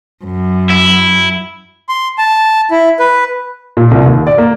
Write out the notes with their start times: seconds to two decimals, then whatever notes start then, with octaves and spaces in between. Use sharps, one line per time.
0.24 F#2
0.70 E4
1.89 C6
2.18 A5
2.71 E4
2.99 B4
3.77 A#2
3.91 C2
4.06 D#2
4.27 D5
4.38 A#3